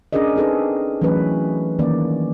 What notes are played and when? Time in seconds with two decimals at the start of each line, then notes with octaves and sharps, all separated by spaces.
0.13 C#4 D4 G#4 A#4 D5 D#5
0.36 C4 D#4 G#4 A4 B4
1.02 E3 F#3 A3 C#4 B4
1.79 D#3 E3 A#3 C#4 D5